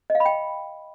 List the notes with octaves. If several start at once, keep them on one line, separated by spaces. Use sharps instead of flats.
D#5
F5
B5
G5